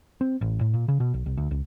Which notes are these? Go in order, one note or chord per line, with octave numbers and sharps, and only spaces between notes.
C4
A1
A2
A#2
C#3
B2
B1
C2
D2
C#2